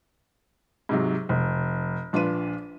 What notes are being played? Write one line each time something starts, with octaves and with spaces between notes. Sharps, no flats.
G#2 C3 F#3
F1
A#1 D4 F4 B4 D#7